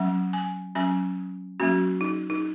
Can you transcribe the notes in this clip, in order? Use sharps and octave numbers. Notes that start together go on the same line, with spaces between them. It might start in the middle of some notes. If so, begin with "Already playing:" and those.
Already playing: F#3 C#4 F#5
G#5
F#3 C#4 G#5
F#3 A#3 C#4 F#4
D#4
D#4